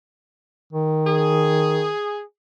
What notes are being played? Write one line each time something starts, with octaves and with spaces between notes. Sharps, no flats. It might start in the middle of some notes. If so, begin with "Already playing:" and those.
D#3
G#4